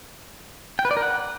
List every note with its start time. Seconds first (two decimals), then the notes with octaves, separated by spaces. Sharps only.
0.79 G5
0.85 B4
0.91 D5
0.97 A#4
1.03 F#5